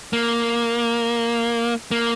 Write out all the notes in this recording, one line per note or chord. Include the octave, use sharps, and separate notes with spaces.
A#3
A#3